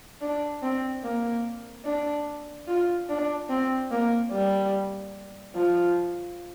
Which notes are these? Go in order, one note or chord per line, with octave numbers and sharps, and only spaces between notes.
D4
C4
A#3
D4
F4
D4
C4
A#3
G3
F3